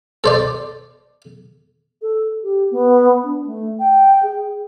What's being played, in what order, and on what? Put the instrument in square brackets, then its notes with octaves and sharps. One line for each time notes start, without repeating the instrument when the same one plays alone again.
[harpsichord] A4 C5 D5
[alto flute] A4
G4
B3
D4
A3
G5
G#4